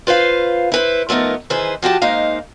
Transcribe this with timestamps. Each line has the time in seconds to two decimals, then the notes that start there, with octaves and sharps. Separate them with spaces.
0.07 F4 B4 C5 F5
0.72 E4 B4 C5
1.09 F3 A3 B3 D#4 A#4
1.50 D#3 E3 G#4 B4 C5
1.82 F3 F#4 G4 A5
2.02 G#3 A#3 D#4 C5 F5